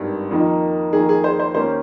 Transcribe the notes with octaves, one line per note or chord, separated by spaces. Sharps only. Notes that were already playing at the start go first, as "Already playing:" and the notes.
Already playing: G#1 G2 D#3
F2 D#3 A#3 D#4
F2 D#3 A#3 D#4 G#4
G#4
C5
C5
D#2 D#3 A#3 C#4 C5